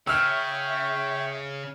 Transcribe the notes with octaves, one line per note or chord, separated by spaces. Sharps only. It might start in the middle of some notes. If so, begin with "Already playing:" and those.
C#3 C#5 E5 G5 C#6 E6 F6